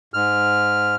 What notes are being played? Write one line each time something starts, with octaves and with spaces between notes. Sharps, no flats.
G#2 F6